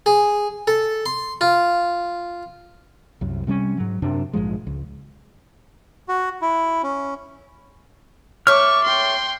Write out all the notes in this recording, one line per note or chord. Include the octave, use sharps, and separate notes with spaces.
G#4
A4
C6
F4
C2 F#2
C3 G3 A#3 C#4
G#2 F#3
F#2 C3 D4
A#1 G#2 F3 G#3
C#2
F#4
E4
C#4
A3 C#5 C#6 D6 F6
G5 C6